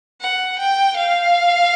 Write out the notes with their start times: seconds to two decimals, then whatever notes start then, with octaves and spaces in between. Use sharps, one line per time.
0.21 F#5
0.59 G5
0.97 F5